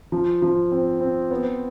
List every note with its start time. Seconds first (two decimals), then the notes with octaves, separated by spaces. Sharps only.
0.12 F3
0.42 F3
0.72 C4
1.01 C4
1.31 B3